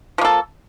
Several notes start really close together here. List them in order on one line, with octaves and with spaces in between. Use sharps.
F3 A#3 A4